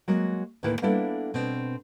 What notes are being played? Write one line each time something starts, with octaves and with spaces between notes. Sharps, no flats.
F#3 G#3 A#3 F#4
D2 A2 D#3 A#3 E4 B4
G3 A#3 B3 D4 E4 A4
B2 C4 D4